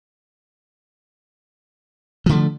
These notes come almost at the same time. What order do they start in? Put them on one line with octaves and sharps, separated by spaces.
F3 D3 A3